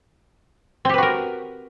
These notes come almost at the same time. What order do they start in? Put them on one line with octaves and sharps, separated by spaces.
C4 G4 B4 F#4 A#4